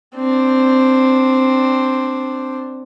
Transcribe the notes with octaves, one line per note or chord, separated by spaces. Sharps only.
C4 D4